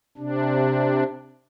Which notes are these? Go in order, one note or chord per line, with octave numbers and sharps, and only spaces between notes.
C3 D4